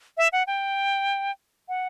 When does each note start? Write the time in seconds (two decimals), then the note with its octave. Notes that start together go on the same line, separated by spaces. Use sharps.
0.17 E5
0.33 F#5
0.47 G5
1.69 F#5